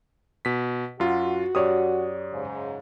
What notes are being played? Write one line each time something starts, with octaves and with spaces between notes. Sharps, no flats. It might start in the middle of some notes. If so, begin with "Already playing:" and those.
B2 B6
F#2 F4 F#4
F#2 G4 C#5 D5 D#6
G#2 C#3